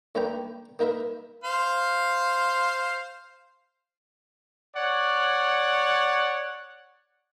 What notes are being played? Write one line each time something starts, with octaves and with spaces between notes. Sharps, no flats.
D#2 A3 D4 B4 G5 A#5
A#3 D#4 A#4 B4 E5
C5 F5
C#5 D5 F#5